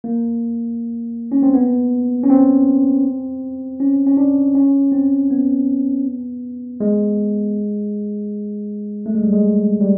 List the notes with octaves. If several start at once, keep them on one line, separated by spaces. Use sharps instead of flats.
A#3
C#4
C4
B3
C#4
C4
C#4
C#4
D4
C#4
C4
B3
G#3
A3
G#3
G3
G#3
G3